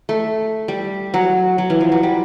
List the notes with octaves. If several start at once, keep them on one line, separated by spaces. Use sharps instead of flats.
A3
G3
F#3
F#3
E3
F3
F#3
G3